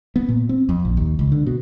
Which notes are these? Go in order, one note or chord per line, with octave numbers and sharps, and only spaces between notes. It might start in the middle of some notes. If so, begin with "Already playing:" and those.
B3
A#2
C4
F2
A#1
D#2
C#2
D3
B2